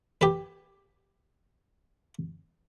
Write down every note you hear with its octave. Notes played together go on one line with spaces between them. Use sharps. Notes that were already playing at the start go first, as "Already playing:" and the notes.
G4 B4